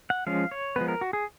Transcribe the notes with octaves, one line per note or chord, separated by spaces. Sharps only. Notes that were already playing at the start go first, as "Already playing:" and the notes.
F#5
F3 G#3 C#4 F5
C#5
F3 G#3 B3 B4
A#4
F#4
G#4